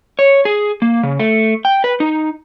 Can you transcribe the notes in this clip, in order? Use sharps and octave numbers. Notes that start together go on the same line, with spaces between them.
C#5
G#4
A#3
C#3
A3
G5
B4
D#4